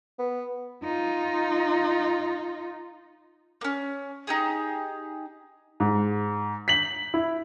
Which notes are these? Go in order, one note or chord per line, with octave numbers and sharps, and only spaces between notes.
B3
D#4 F4
A#3 C#4
D#4 G4 G#4
G#2
B6 F#7
E4